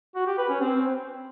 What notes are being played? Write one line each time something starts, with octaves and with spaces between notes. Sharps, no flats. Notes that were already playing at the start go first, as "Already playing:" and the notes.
F#4
G4
B4
C#4
C4